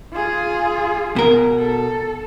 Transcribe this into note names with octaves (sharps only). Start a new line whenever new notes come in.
F4 G#4
B2 A#4
A4